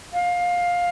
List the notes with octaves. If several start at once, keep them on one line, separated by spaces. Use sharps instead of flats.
F5